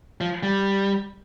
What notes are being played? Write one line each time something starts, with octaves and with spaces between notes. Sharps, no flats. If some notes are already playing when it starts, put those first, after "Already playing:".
F3
G3